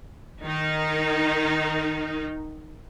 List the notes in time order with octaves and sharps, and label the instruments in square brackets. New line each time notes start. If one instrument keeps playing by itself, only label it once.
[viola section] D#3 D#4